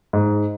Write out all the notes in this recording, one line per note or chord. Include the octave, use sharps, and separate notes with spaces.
G#2